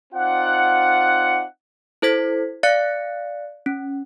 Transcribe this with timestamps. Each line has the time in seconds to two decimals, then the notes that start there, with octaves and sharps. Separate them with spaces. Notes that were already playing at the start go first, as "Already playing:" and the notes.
0.14 C4 D#4 F4 D5 F#5
2.02 E4 A4 C5 G#6 B6
2.63 D5 F5 F#6 A6 C#7
3.66 C#4